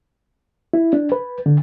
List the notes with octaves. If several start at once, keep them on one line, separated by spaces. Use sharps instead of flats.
E4
D4
B4
D3